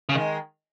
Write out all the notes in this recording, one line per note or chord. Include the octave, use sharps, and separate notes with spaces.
C#3
D#3 G#3